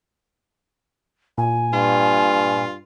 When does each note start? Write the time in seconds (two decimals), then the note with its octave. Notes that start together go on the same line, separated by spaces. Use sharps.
1.38 A#2 G#5
1.73 G2 F4